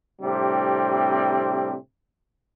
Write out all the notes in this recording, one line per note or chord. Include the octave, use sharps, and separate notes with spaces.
A2 C3 G3 C4 D4